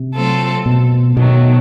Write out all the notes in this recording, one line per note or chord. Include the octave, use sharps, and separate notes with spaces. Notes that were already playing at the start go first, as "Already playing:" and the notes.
Already playing: C3
F#3 A3 C4 F4 A4
B2
B2 D#3 F#3 A3